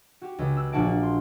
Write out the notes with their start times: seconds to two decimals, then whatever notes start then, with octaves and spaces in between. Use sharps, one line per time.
0.21 F#4 G4
0.38 C#2 C#3
0.57 E6 F#6
0.73 A#1 D4 F#4 F#5 A5 D7
0.87 A#3
1.03 C6